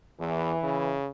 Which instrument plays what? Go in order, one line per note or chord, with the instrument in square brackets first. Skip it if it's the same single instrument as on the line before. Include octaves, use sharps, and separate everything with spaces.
[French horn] E2 [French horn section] E3
[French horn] C#3